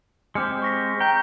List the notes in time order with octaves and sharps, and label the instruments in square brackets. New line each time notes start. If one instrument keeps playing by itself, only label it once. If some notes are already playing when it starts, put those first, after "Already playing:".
[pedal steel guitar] G#3 C4 G4 [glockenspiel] D6 F6 C#7
[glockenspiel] C#6 A#6 B6
[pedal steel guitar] G5 [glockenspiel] A#5 G6